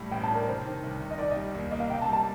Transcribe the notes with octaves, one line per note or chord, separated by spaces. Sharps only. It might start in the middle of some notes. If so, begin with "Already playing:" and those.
Already playing: A2 G3 A3
A1 G5
A5
D4
A#4
C3 C5
D#3
C2
C2
D#5
D#3 D5
D#5
G3
D#2
A#3 D#5
F5
C3 G5
A5
G3
A5